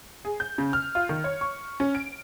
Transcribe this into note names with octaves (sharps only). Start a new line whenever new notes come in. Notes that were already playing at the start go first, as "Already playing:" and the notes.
G#4
G6
C#3
F6
F4
D#3
C#5
C#6
C#4
D7